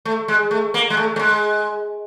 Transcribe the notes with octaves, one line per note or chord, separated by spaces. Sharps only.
A3
G#3
A3
A#3
G#3
A3
A3
G#3